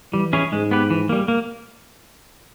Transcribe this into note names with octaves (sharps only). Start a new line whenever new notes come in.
E3 G3
C#4 E4 G#4 C#5
G#2 G#3
B3 G4 B4
E3
G3 A#3
A#3